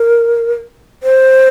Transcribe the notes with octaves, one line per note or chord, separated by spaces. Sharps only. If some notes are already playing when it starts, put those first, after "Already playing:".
Already playing: A#4
C5